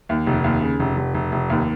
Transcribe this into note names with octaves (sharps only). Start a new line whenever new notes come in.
D#2
F1
D#2
C#3
F1
F1
F1
F1
D#2